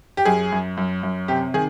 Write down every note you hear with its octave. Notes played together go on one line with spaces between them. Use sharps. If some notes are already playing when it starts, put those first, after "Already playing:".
G4
F#2 G#4
F#2
F#2
F#2
C3 G4
D#3 G#4